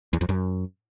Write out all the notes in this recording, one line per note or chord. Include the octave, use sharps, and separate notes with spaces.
E2
F2
F#2